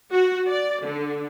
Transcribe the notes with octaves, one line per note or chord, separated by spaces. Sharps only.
F#4
D5
D3